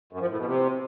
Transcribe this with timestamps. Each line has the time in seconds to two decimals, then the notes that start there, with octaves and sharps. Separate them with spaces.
0.13 F#2
0.21 F3
0.29 A2
0.38 B2
0.46 C3